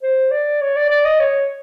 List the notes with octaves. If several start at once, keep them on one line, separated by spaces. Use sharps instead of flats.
C5
D5
C#5
D5
D5
D#5
C#5